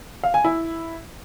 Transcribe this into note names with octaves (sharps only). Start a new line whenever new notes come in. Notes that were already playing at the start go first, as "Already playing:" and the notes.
F5
G#5
E4